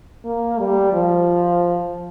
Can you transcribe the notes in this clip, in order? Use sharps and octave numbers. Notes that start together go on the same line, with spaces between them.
A#3
G3
F3